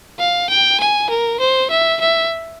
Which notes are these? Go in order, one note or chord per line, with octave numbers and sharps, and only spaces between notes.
F5
G5
G#5
A#4
C5
E5
E5